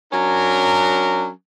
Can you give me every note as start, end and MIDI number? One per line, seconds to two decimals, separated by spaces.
0.12 1.29 54
0.12 1.29 61
0.12 1.29 62
0.12 1.29 70